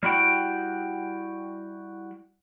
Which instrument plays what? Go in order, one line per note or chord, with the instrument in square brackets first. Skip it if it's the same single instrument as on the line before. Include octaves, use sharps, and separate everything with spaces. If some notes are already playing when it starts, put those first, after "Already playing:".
[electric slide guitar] G3 E4 F#4 G5